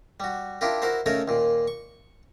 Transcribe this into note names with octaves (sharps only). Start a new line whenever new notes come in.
G3 F#4
D4 E4 F4 G4 A#4
E4 F#4 A#4 C5
C#3 A3 D#4 A4 A#4 C#5
D#2 A#2
C#6